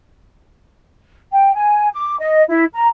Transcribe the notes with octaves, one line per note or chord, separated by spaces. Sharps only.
G5
G#5
D6
D#5
E4
A#5